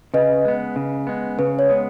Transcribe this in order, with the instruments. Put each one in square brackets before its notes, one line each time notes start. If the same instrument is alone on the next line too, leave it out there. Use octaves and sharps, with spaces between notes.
[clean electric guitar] C#3 [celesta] B4 D#5
[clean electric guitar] G#3 B3
C#3
G#3 B3
[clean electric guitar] C#3 [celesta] B4
[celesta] C#5
[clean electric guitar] G#3 B3